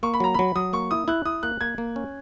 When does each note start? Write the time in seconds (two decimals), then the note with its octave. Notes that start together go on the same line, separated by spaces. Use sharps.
0.03 A#3 C#6
0.14 B5
0.20 F#3 A#5
0.34 F#3 B5
0.56 F#3 D#6
0.73 A#3 C#6
0.91 E4 D#6
1.08 E4 F#6
1.25 E4 D#6
1.43 A#3 F#6
1.61 A#3 G#6
1.78 A#3
1.96 C#4